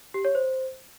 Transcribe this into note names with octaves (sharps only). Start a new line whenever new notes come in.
G4
C#5
C5